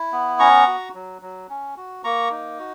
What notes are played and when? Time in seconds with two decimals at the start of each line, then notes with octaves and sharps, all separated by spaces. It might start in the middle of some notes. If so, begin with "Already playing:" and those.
Already playing: E4
0.12 B3
0.39 C#4 A#5 C#6
0.67 F#4
0.95 F#3
1.22 F#3
1.50 C#4
1.77 F#4
2.04 A#3 A#5 C#6
2.32 D#4
2.59 F#4